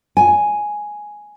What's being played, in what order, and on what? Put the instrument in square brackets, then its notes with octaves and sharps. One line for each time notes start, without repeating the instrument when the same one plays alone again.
[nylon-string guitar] G#5